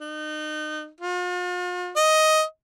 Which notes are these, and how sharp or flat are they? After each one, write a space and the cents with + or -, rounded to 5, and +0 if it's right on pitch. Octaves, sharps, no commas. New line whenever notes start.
D#4 -30
F4 +45
D#5 +10